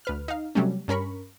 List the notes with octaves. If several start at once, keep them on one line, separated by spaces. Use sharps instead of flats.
D2 B4 F6
D#4 F5
C3 F#3 G3 A3 C#4
G2 C#4 A#4 B5 C#6